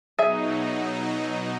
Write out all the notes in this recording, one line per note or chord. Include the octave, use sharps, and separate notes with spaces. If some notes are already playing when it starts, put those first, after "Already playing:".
B2 F#3 D#4 G#4 E5